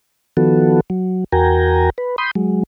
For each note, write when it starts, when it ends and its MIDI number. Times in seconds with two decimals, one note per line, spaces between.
0.37 0.81 51
0.37 0.81 53
0.37 0.81 59
0.37 0.81 66
0.37 0.81 69
0.90 1.24 54
1.32 1.90 40
1.32 1.90 66
1.32 1.90 70
1.32 1.90 79
1.32 1.90 80
1.32 1.90 82
1.98 2.16 71
2.18 2.31 83
2.18 2.31 84
2.18 2.31 87
2.18 2.31 91
2.35 2.63 54
2.35 2.63 56